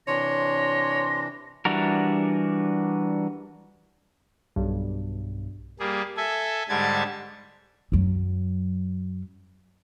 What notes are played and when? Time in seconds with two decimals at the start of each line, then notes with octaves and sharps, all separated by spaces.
0.08 C3 E3 D4 C#5 C6 A#6
1.65 E3 G3 D4 F#4 A#4
4.56 B1 G2
5.79 G3 A#3 G#4
6.17 A4 E5 G#5
6.69 G#2 D3 G3 A5 G#6
7.92 F#2 F#3